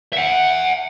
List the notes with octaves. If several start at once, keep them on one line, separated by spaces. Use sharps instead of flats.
E5 F#5